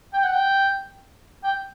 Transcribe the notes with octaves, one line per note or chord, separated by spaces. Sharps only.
G5
F#5
G5
G5